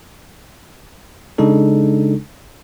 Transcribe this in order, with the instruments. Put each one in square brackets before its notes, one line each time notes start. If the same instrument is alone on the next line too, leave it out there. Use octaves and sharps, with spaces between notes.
[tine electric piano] C#3 G#3 D4 D#4 A4